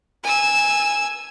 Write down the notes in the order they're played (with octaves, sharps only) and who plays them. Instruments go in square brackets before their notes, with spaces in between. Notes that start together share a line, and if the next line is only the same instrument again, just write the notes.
[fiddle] G#5 E6